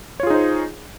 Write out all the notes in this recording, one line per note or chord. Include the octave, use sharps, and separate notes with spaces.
D#4 F4 G#4 C5 C#5